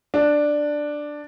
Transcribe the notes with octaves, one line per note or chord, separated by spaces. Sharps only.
D4